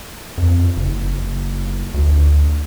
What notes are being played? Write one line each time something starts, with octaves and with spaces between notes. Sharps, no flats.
F2
F#1
D2